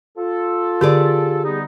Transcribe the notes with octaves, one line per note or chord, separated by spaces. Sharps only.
F4 A4
D3 G4 G#4 D5
G3 B3 D#4